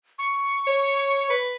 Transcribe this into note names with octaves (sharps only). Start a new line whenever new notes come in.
C#6
C#5
B4